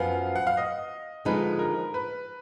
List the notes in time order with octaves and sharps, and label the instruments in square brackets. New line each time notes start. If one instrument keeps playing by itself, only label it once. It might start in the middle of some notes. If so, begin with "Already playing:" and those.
Already playing: [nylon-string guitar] F#2 F3 B3 [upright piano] F5
[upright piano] F#5
F5
D#5
[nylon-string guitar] D3 F3 G#3 D#4 [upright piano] B4
[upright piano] A#4
B4